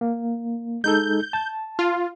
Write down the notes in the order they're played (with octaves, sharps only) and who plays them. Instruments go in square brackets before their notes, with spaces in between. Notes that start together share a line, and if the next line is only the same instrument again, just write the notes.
[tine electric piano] A#3
[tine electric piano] G#3 D#4 A4 [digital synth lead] G6
[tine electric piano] A5
[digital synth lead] F4